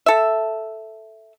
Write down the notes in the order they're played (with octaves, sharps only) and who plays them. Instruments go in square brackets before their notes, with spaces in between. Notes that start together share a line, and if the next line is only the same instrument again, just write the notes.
[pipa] A4 E5